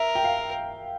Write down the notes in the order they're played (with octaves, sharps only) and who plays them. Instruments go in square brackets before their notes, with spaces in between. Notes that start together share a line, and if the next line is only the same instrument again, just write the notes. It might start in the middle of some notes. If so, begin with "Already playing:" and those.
Already playing: [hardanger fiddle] A#4 [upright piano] E5
[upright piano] G5
F5